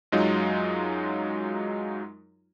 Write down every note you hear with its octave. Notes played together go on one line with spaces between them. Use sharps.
F#2 F#3 G#3 D#4 F4